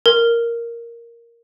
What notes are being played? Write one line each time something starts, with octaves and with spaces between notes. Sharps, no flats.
A#4